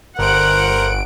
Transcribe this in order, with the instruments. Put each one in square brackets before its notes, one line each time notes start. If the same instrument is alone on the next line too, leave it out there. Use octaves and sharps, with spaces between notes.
[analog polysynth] G1 D7 [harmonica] A#4 C5 [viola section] F#5